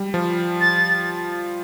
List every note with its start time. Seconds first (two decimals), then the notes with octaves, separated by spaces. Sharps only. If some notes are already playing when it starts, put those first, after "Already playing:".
Already playing: G3
0.14 F3
0.61 A6